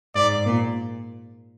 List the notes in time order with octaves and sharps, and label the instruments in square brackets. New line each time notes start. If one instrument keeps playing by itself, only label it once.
[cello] G#2 [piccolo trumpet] D5
[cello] A#2